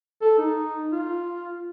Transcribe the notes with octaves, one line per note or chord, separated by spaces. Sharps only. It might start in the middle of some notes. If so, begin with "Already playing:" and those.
A4
D#4
F4